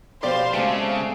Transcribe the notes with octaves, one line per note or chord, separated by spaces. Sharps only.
B2 F3 G4 C5 D5 F5 C6
C#3 G#3 A3 C4 A5